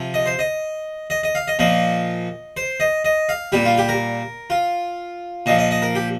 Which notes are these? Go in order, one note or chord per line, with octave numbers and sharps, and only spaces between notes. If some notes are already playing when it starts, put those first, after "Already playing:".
Already playing: C3 F3
D#5
C5
D#5
D#5
D#5
F5
D#5
A#2 F3 D#5
C5
D#5
D#5
F5
A#2 G3 G4
F4
G4
A#4
F4
A#2 F3 D#5
D#5
D#5
A#4
G4